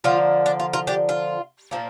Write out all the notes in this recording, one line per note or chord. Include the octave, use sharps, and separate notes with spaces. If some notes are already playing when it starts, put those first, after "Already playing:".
D3 F3 A#3 F4
D4
F4
F4 A#4
D4 G4
F4
A#2 F3 A#3